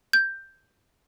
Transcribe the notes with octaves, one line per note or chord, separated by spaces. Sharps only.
G6